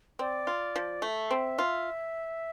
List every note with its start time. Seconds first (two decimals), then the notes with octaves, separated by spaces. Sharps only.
0.19 C4 D5
0.47 F4
0.76 F3
1.02 A3 E5
1.31 C4
1.59 F4